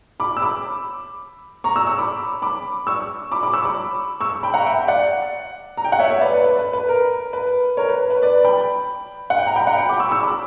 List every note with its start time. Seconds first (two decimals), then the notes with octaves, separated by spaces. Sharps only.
0.20 B5 D6
0.37 E6
0.42 B5 D6
1.64 A#5 C#6
1.75 C#6 E6
1.87 C#6 E6
1.98 B5 D6
2.42 B5 D6
2.87 C#6 E6
3.32 B5 D6
3.43 B5 D6
3.54 C#6 E6
3.65 B5 D6
4.21 C#6 E6
4.43 G5 B5
4.54 F#5 A#5
4.66 E5 G5
4.88 D5 F#5
5.77 A#5
5.84 G5
5.92 F#5
5.99 C#5 E5
6.10 C#5 E5
6.21 B4 D5
6.33 B4
6.44 B4
6.59 B4
6.73 B4
6.89 A#4
7.33 B4
7.77 A#4 C#5
7.89 B4
8.10 B4
8.22 B4 D5
8.44 G5 B5
9.30 F#5
9.38 G5
9.47 A#5
9.56 G5 B5
9.67 F#5 A#5
9.78 G5 B5
9.89 B5 D6
10.00 C#6 E6
10.11 C#6 E6
10.23 B5 D6